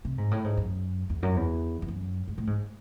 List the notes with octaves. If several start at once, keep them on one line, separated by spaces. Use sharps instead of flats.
C3
G#2
A2
G#2
F#2
E2
F#2
E2
E2
F#2
G#2
A2
G#2